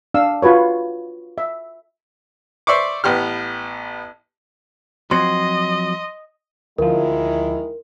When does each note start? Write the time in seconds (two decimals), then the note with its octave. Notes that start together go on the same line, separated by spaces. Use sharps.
0.14 D4 F5 E6
0.42 F4 F#4 B4 C#5
1.38 E5
2.67 C5 D5 E5 C#6 D6
3.04 A1 B3 G4 F6
5.11 F3 F#3 C4 D#5 C6
6.78 D2 D#3 F3 G#3 E4 A#4